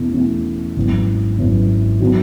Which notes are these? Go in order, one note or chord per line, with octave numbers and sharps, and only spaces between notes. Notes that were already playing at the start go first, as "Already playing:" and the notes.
Already playing: E2 B2 A3 C#4 E4
E2 B2 A3 C#4 E4
G#1 F#2 E3 B3
G#1 F#2 E3 B3
D#3 F#3 B3